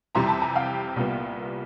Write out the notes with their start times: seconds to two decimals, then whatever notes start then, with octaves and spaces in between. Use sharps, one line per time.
0.15 F2 C3 E3 G3 A#5 C6
0.28 A5 B5
0.41 G#5 A#5
0.55 F5 G5
0.96 C2 A#2 G3 B3